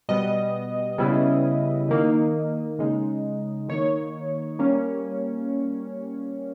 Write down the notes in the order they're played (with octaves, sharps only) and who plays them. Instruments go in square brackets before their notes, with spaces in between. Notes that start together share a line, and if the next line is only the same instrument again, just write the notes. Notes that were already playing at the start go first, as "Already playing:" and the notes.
[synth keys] B2 G3 B3 D#5
C#3 G3 B3 E4
D#3 A#3 D#4
C#3 G#3 D#4
D#3 A#3 D#4 C#5
G3 A#3 C#4